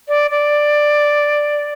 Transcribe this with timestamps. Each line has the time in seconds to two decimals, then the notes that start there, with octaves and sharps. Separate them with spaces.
0.08 D5
0.31 D5